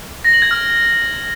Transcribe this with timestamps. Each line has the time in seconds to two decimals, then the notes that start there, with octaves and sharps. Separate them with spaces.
0.24 A#6
0.33 F#7
0.42 G#6
0.51 F6